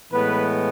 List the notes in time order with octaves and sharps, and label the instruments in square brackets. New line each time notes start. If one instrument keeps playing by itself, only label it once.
[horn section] A2 E3 G#3 B3 B4